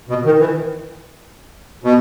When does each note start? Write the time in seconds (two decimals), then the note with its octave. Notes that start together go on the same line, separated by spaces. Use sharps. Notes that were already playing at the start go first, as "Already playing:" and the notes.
0.09 B2
0.25 D#3
0.40 E3
1.84 B2